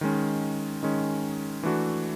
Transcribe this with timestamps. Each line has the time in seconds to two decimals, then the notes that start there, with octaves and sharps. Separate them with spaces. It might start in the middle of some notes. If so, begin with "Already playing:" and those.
0.01 D#3 G#3 C#4
0.83 D#3 G#3 C#4
1.63 E3 A3 D4 F#4